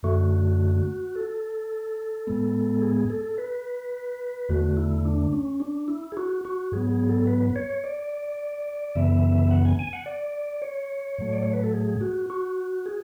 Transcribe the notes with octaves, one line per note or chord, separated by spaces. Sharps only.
F#2 D3 A3 F#4
A4
A2 G#3 B3
G#4
A4
B4
E2 D3 A3 F#4
E4
D4
C#4
D4
E4
G#4
F#4
F#4
G#2 F#3 B3 G#4
G#4
A4
B4
B4
C#5
D5
F#2 C#3 E3 B3 E5
F#5
G#5
G#5
F#5
D5
C#5
A2 F#3 A3
D5
C#5
B4
A4
G#4
F#4
F#4
G#4